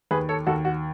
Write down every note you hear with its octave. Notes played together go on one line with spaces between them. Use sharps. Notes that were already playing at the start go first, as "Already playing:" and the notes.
D#2 G#4 B4
A4 C#5
D#2 F#4 A4
F#4